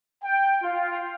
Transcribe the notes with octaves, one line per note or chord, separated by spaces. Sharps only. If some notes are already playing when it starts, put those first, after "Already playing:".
G5
F4